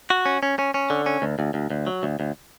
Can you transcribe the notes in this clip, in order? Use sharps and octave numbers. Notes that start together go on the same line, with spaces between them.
F#4
C#4
C#4
C#4
C#4
D3
C#4
D2
D2
D2
D2
F#3
D2
D2